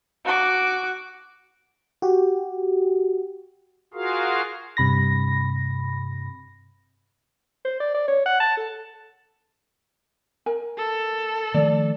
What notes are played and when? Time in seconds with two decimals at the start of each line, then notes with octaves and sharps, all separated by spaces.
0.25 F#4 D6
2.02 F#4 G4
3.94 F4 F#4 G#4 A#4 F5
4.77 G2 C3 B5 A#6
7.65 C5
7.80 D5
7.94 D5
8.08 C#5
8.26 F#5
8.40 A5
8.57 A4
10.46 A#4 G#5
10.78 A4
11.54 D#3 F3 A3 D5